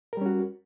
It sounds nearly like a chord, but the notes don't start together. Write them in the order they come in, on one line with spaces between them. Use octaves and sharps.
A#4 G3 C#4 F#4